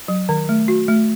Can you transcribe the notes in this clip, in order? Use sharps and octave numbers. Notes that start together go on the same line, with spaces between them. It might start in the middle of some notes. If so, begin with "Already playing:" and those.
F#3
D#3
A3
F#4
A3